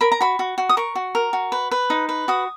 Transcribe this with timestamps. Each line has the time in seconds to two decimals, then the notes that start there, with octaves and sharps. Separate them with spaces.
0.01 A#4 B5
0.12 A#5
0.21 F#4 B5
0.39 F#4
0.58 F#4
0.69 D#6
0.77 A#4 C#6
0.95 F#4
1.15 A#4
1.33 F#4
1.52 B4
1.71 B4
1.90 D#4
2.09 B4
2.28 F#4 D#6